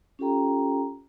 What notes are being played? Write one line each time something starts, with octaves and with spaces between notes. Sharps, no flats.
C#4 F4 G4 A4 G5 A#5